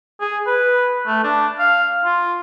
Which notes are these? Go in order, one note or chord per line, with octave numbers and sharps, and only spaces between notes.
G#4
B4
A3
D4
F5
F4